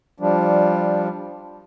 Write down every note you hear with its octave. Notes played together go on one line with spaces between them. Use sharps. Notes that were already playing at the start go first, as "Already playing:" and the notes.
F3 G3 D4